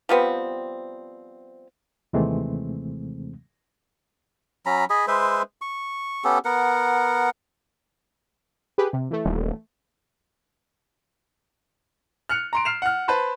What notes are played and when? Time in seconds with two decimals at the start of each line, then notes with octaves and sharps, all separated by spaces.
0.09 F3 G3 B3 C4
2.13 D#2 C3 E3 G#3 A3 C4
4.66 F#3 C#4 A#5 B5
4.90 G#4 D#5 B5
5.08 G#3 B4 C5 E5
5.62 C#6
6.24 B3 C#4 G4 A4
6.45 B3 A#4 F#5
8.78 G4 G#4 B4
8.93 C3
9.11 E3 A3
9.25 D#1
12.29 F6 F#6 C#7 F7
12.53 A#5 C6 D7
12.65 F6 C7 E7 F7
12.82 F#5 F6
13.08 B4 C5 A5 B5 C6